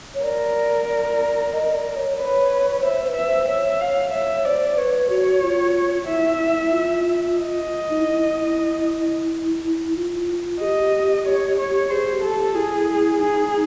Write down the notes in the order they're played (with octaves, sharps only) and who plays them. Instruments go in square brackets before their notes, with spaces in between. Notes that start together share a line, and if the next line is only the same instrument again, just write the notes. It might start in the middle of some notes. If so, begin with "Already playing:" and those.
[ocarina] C#5
[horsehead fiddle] A#4 [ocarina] D5
[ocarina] D5
D#5
D5
C#5
[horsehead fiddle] B4 [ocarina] D5
[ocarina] C#5
[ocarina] C5 [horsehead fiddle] E5
[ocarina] C5
B4
[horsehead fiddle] E5
[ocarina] C5
[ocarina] C#5 [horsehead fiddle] E5
[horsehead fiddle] F5
[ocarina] C#5 [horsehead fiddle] E5
[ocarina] C5 [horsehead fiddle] D5
[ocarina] B4 [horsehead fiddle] C#5
[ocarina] F#4 [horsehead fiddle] C#5
[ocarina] F4
F4
[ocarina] E4 [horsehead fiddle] E5
[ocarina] E4
E4
F4
[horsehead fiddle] D#5
[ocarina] D#4
E4
E4
F4
[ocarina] G#4 [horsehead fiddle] D#5
[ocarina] G4
[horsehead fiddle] C#5
C#5
[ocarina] G#4 [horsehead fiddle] C5
[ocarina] G4
[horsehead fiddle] A4
[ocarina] G4
[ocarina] E4 [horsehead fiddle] G#4
[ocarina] D#4 [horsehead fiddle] G#4